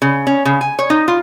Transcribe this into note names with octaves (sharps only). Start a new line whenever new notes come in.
C#3
C#4
C#3
G#5
C#5
D#4
F4